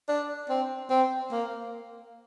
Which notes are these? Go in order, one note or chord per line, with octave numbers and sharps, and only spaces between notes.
D4
C4
C4
A#3